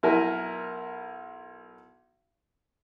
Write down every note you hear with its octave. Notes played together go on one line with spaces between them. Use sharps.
B1 E4 A#4 G#5